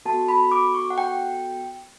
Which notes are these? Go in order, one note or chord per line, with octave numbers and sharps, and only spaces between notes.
B3 F#4 A4 A5
B5
D6
C#6
F#5
G5